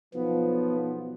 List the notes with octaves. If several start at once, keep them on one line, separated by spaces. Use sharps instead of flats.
B1 F3 B3